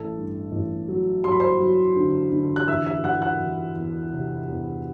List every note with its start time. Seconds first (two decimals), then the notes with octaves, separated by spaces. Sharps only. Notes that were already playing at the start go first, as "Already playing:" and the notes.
Already playing: A1 A4
0.16 G2
0.52 A1
0.88 F#3
1.24 F#3 C6
1.32 B5
1.40 C5 C6
1.60 F#3
1.96 D3
2.32 D3
2.56 F#6
2.68 E3 E5 E6
2.86 E5 E6
3.04 E3 F#5 F#6
3.22 F#5 F#6
3.40 E3
3.76 E2
4.13 C3
4.49 E2